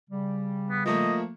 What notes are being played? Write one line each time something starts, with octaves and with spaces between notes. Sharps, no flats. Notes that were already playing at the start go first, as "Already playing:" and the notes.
C#3 G3
B3
F3 A3 A#3 D#5